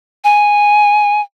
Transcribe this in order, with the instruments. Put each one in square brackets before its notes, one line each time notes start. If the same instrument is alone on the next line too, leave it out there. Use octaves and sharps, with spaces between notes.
[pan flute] G#5